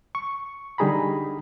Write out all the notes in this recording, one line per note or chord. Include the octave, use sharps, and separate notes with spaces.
C#6
D3 G3 D#4 G#4 A#5 B5